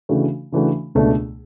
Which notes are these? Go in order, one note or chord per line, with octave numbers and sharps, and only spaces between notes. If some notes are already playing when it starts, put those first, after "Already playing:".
C#3 E3 A3 D4 F#4
C#3 E3 A3 D4 F#4
C#2 B2 A3 D4